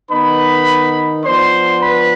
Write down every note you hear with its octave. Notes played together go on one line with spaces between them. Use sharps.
D#3 B3 D#4 B4 B5
F3 B3 D4 C5 C6
B4 B5